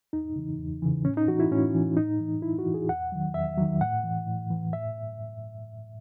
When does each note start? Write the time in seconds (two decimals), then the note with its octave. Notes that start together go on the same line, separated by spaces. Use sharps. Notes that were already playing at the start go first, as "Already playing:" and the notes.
0.13 E2 D#4
0.36 C#3 E3
0.59 E2
0.82 C#3 E3
1.05 A2 C#4
1.17 D#4
1.28 E3 F#4
1.40 E4
1.51 A2 C#4
1.74 E3
1.96 A2 D#4
2.20 E3
2.42 A2 E4
2.58 F#4
2.65 E3
2.74 G#4
2.89 E2 F#5
3.12 D#3 F#3
3.34 E2 E5
3.58 D#3 F#3
3.81 A2 F#5
4.03 E3
4.27 A2
4.50 E3
4.73 A2 E5